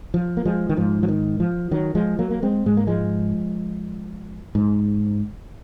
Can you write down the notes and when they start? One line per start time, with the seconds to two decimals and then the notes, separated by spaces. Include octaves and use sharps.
0.14 F3
0.37 A#3
0.45 F3 G#3
0.69 D#3
0.77 G#2 F3
1.03 F3
1.08 D#3
1.40 F3
1.71 D#3 F#3
1.95 F3 G#3
2.19 F#3 A#3
2.31 A#3
2.42 G#3 C4
2.66 G#2 G#3
2.77 A#3
2.87 F3 G#3
4.55 G#2